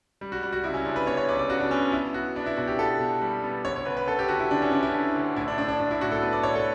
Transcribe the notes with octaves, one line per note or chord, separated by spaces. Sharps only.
G3
F#4
G3 F#4
F#4
C#2 E4
C#4
C#2 D4
B4
B3 C#5
C#5
C#2 D5
D5
C#3 F#4
D4
B3 C#4
B3 E4
B3 F#4
B3 D4
E4
B2 F#4
G4
B3 A4
B2
G3
B3
D2 C#5
C#5
D2 B4
B4
D2 A4
G4
D2 F#4
E4
D3 D4
C#4
D3 D4
E4
D3
D2
A2 E4
D4
A2 D4
D4
A2 D4
E4
A2 F#4
A4
B3 B4
D5
A2 C#5
A4